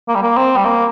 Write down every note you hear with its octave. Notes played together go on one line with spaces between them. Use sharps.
A#3
G3
A#3
C4
G3
A#3